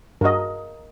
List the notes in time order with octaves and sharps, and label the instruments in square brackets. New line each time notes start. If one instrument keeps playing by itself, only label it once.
[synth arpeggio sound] G2 F#4 [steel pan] A#4 D#5